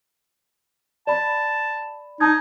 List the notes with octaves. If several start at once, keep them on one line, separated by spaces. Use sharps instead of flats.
D5 A5 B5
D#4 A5 D#6 G#6